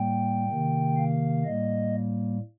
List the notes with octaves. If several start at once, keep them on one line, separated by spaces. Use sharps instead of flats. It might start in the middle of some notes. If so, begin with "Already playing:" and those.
Already playing: A2 G3 A#3 G5
C3 D#3 A#3
F5
A2 G3 A#3 D#5